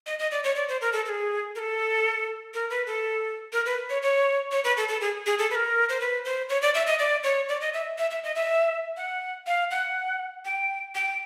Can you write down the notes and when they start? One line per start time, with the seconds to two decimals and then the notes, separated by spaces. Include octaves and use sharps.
0.07 D#5
0.19 D#5
0.31 D5
0.44 C#5
0.56 D5
0.68 C5
0.81 A#4
0.93 A4
1.05 A4
1.09 G#4
1.55 A#4
1.59 A4
2.54 A#4
2.70 B4
2.87 A4
3.53 A#4
3.66 B4
3.90 C#5
4.02 C#5
4.52 C#5
4.64 B4
4.77 A4
4.88 A4
5.01 G#4
5.26 G#4
5.39 A4
5.51 B4
5.55 A#4
5.89 C5
6.01 B4
6.25 C5
6.49 C#5
6.62 D5
6.74 E5
6.87 D#5
6.99 D5
7.24 C#5
7.49 D5
7.61 D#5
7.74 E5
7.98 E5
8.11 E5
8.24 D#5
8.35 E5
8.97 F#5
9.47 F5
9.71 F#5
10.45 G5
10.95 G5